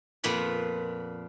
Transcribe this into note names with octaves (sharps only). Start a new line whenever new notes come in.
F2 A#2 B3 B5